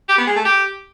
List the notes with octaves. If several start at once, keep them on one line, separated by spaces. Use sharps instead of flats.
G4
B3
G#3
A3
G4